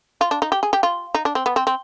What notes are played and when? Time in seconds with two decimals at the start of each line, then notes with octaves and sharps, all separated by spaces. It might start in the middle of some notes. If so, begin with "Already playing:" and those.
0.21 F4
0.31 D4
0.42 D#4
0.52 G4
0.63 G#4
0.73 G4
0.83 F4
1.14 D#4
1.25 D4
1.35 C4
1.46 B3
1.56 C4
1.67 C4